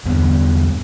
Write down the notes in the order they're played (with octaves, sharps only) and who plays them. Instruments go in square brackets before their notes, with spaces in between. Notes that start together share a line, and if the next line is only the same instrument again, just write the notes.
[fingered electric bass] E2 G2 D3 B3